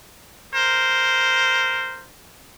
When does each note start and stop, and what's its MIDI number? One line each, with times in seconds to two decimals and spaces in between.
0.55 2.07 70
0.55 2.07 72